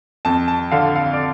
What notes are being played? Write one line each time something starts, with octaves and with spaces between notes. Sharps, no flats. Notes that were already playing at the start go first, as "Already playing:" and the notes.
F2 A5
A5
D3 F5
F5
D5